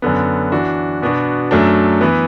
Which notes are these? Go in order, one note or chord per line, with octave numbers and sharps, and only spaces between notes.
F#2 D3 B3
E3 D4 F#4
B2 B3 D4 F#4
F#2 F#3 A3 D4
E3 B3